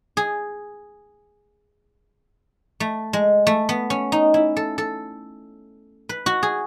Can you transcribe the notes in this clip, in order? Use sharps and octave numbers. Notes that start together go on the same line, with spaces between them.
G#4
A3
G#3
A3
B3
C#4
D#4
E4
A4
A4
B4
F#4
G#4